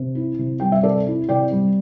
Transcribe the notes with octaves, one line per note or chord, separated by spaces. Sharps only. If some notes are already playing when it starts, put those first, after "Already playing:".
Already playing: C3
E4
C3
G3 G5
E5
C3 A4 D5
E4
C3 D5 G5
G3